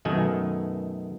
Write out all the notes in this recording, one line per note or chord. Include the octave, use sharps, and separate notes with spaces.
F#2 B2 D#3 A3 G#5